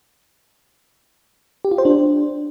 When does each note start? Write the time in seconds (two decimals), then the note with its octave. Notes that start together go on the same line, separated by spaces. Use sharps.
1.65 G4
1.71 F4
1.78 C5
1.85 D4